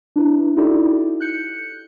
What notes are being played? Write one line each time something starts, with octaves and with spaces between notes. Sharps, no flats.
D4 E4 B4
D#4 E4 F#4 G4 A4 D5
F#6 G6 C#7